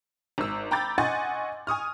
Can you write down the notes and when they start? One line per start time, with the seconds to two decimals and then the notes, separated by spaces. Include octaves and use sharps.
0.38 G#1 E6
0.71 G5 A#5 B5 D6 G6 A6
0.98 D#5 F#5 G#5 C6 C#6 A6
1.67 G#5 C#6 D#6 F6